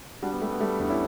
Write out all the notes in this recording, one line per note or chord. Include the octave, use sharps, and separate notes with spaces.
G3 D4 F#4
B3
G3 A3
B3
G3 A3
E2 B3 D4
C#4 E4